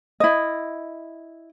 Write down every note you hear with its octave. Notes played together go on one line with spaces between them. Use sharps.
E4 D#5